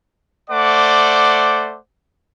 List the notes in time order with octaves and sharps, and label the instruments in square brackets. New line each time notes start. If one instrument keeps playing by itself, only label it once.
[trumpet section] A3 C5 D5 F#5 D6